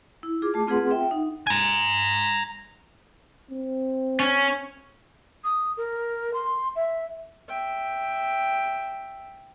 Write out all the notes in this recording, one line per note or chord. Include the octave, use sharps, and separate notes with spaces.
E4
F4 G#4 D6
A3 A5
C4 F4 G#4 B4 F#5 C6
E5 G5
D#4 F#5
G#5 A#5
C4
C#4
D#6
A#4
C6
E5
E5 G5